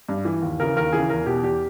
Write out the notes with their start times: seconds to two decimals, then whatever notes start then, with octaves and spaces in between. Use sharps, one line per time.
0.09 G2
0.25 E3
0.42 D#2
0.60 C#3 E3 A#4
0.76 D#2 A#4
0.93 C#3 E3 G#4
1.10 E2 A#4
1.26 B2 G4
1.43 E2 G4